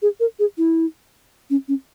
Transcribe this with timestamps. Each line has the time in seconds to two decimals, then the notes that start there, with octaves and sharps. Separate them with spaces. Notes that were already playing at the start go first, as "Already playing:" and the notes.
0.02 G#4
0.20 A#4
0.39 G#4
0.58 E4
1.50 C#4
1.68 C#4